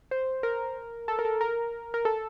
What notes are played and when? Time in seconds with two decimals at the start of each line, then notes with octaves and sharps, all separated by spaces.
0.11 C5
0.43 A#4
1.08 A4
1.19 A#4
1.25 A4
1.41 A#4
1.94 A#4
2.05 A4